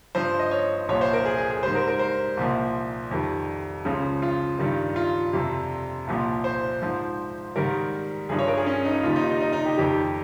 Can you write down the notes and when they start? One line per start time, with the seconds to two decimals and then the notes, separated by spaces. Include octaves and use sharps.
0.15 G2 F3 C5
0.39 D#5
0.51 C#5
0.89 C2 A#2 F3 C#5
1.01 C5
1.13 A#4
1.25 G#4
1.38 G#4
1.51 G#4
1.63 G#2 G3 C5
1.75 A#4
1.88 A#4
1.99 C5
2.37 C2 A#2 F3
3.11 F2 D#3 G3
3.85 C#2 C#3 F3
4.22 F4
4.59 G2 D#3 G3
4.96 F4
5.33 F2 C3 G3
6.07 C2 A#2 F3
6.44 C5
6.82 G#2 F3
7.56 G#2 D#3 G3 A#4
8.29 G2 F3 G#4
8.39 C#5
8.48 A#4
8.57 G#4
8.66 C#4
8.85 D#4
9.03 D#2 D#3 G3 F4
9.16 D#4
9.29 D#4
9.41 D#4
9.53 D#4
9.66 G4
9.78 F2 D#3 G3 G4